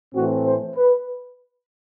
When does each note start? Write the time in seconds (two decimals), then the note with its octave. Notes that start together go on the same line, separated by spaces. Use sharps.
0.15 A2 E3 A3 C4 F#4
0.45 C5
0.75 B4